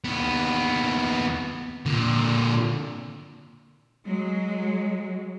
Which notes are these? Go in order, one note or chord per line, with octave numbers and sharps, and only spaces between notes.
D#2 B3
A#2 D3
F#3 G#3